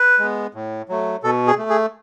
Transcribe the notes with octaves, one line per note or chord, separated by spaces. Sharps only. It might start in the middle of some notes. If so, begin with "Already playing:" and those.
Already playing: B4
G#3 B3
A2
F#3 A3
B2 A4
G#4
A3
G#4